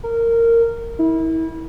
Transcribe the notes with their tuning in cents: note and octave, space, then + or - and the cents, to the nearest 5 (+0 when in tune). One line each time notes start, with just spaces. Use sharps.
A#4 -15
E4 -30